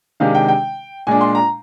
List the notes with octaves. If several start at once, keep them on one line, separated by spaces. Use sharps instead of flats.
C3 D#3 G#3 D4 F5
G5
G5
A#2 G#3 D4 G#5
C6
A#5